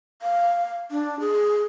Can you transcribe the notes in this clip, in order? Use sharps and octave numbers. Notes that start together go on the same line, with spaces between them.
F5
D4
G#4